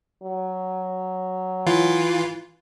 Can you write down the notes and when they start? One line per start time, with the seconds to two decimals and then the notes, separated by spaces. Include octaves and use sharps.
0.23 F#3
1.67 E3 F4